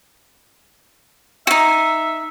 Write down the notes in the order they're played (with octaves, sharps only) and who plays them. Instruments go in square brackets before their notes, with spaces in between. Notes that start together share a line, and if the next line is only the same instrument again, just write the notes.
[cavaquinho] D#4 F#4 [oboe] E5